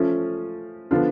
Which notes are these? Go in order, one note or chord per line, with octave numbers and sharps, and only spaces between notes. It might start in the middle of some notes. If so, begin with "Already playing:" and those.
Already playing: F3 A3 C#4
D3 F3 B3 D4 F4